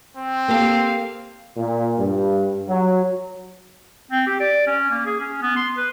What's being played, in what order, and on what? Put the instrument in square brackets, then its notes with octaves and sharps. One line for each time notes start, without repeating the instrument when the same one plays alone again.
[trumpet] C4
[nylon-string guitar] A#3 G4 A4 [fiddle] F5
[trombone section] A#2
G2
F#3
[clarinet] C4
G4
D5
C#4
A#3
G#4
C#4
B3
C6
B4